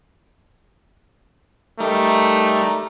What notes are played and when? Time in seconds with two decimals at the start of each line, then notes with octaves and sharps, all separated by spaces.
1.80 G3 A3 D#4 A#4